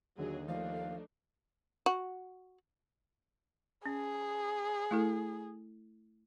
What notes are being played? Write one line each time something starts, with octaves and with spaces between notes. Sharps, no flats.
D#2 D3 F#3 G#4
F3 A3 D4 D#4 F5
F#4
C#4 G#4
A3 E4 A4